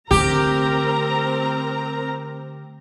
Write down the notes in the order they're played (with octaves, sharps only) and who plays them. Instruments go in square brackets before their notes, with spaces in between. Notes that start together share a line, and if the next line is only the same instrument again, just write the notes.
[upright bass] D3 A3 [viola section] C4 A#4 A#5 [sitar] G4